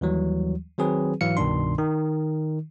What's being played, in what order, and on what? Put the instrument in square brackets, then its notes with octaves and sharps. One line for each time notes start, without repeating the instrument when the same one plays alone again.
[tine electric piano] D#2 E3 F#3 G3
D#3 F#3 C4 G#4 B4
G#2 E3 F#3 F5 C#7
C2 G2 B2 D#3 D4 C6
D#3